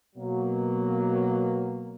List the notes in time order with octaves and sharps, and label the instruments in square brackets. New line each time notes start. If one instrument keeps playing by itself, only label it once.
[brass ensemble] B2 F#3 A#3